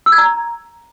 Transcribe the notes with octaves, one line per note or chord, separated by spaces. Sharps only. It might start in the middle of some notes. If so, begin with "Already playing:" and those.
E6
G#6
A#5